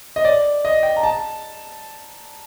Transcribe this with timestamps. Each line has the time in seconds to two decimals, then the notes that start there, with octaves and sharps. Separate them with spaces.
0.16 D#5
0.25 D5
0.65 D#5
0.83 G5
0.96 A#5
1.03 A5